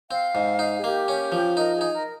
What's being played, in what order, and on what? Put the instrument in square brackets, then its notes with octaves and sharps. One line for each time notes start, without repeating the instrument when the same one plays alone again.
[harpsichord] C4 [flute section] F5
[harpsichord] G#2
D#4
[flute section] G#4
[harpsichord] A#3 [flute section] G4
[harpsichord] C#4
F3
[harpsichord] D#4 [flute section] A#4
[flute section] G#4
[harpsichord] D#4
[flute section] A#4